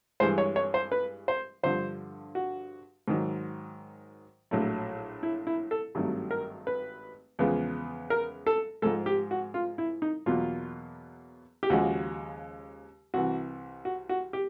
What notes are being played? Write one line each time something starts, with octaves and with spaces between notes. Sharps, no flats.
G2 E3 G#3 C5
C#5
C#5
C5
B4
C5
G2 D3 F3 C5
F#4
G#2 D#3 F#3
A#1 A2 F#3 A3
E4
E4
A4
G#1 G2 D#3 F#3 A3
A#4
B4
E2 C#3 F3 G#3 B3
A#4
A4
G#2 F3 G#3 A4
G4
F#4
F4
E4
D#4
E2 B2 F#3 A#3 F4
G4
D#2 C#3 F3 G#3 F#4
C2 C3 E3 F#4
F#4
F#4
G4